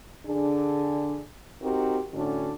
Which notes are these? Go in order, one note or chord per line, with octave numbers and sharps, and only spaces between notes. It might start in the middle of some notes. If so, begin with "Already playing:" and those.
D3 D4 G#4
C4 D#4 F#4 G4 A#4
A2 D3 C#4 D4 F#4